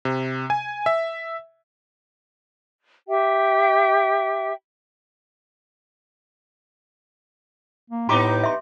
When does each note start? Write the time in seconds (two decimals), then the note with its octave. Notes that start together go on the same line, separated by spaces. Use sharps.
0.05 C3
0.50 G#5
0.86 E5
3.08 G4 E5 G5
7.90 A#3
8.09 A2 B3 D#4 G4 A#5 C6 D6
8.44 E5 C6